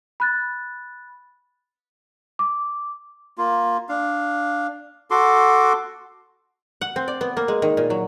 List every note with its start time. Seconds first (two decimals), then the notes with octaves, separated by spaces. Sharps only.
0.20 B5 F#6 A6
2.39 D6
3.38 A#3 F4
3.89 D4 F5
5.11 F#4 A4 C6 D6
6.81 F#5
6.96 C4
7.08 D5
7.21 B3
7.37 A#3
7.48 G#3
7.62 D#3
7.77 A#2
7.90 F#3